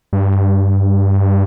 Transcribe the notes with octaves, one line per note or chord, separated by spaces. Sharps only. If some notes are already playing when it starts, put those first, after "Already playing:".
G2